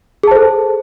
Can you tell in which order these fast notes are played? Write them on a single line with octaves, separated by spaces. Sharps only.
G#4 A5 C5 A4